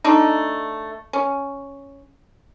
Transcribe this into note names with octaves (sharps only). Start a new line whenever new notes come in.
A3 D4 D#4
C#4